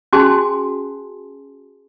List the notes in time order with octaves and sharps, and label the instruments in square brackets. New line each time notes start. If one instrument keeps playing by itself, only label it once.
[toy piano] C#4 F#4 G#4 G#5 A5 C6